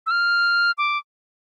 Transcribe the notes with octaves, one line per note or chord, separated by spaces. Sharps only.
E6
F6
D6